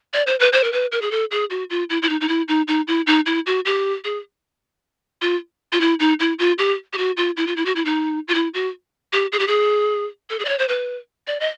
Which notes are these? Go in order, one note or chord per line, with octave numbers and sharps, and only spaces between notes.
D5
C5
B4
C5
A#4
B4
A#4
G#4
A4
G#4
F#4
F4
E4
E4
D#4
D#4
E4
D#4
D#4
E4
D#4
E4
F#4
G4
G#4
F4
F4
E4
D#4
E4
F4
G4
G4
F#4
F4
E4
F4
E4
F#4
E4
D#4
F4
E4
F#4
G4
G#4
G4
G#4
A4
G#4
D5
C#5
C5
B4
D5
D#5